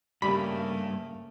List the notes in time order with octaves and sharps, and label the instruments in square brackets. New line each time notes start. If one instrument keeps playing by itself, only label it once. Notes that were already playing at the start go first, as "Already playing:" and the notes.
[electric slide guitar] G2 [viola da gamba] C#3 A3 A#3 [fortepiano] G3 D5 [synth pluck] B5